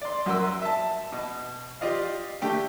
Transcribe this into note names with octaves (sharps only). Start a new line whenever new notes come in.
D5 C6
F#2 F#4 A#4 C6 E6
E5 A5
B2
F4 G4 D5 D#5 F5
D3 A3 G4 G5